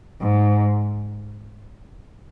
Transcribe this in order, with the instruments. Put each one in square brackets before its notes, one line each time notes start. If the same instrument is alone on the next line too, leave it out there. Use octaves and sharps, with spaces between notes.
[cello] G#2